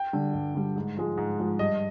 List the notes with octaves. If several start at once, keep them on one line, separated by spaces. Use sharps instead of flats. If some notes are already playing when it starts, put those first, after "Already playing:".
Already playing: G5
D3 G3
G2
D3 G3
G#2
F3 G#3
G#2
F3 G#3
G2 D#5